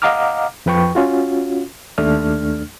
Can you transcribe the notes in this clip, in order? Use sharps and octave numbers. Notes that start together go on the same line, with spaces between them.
D#5 F5 F#5 A#5 D6 F6
F2 F3 B4 G5 C#6
C#4 F4 F#4
D#2 A3 D4 F6